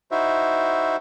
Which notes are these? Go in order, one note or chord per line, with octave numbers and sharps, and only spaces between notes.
D#4 E4 F#4 C5 E5